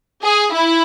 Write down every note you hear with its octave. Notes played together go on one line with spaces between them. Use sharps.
G#4
E4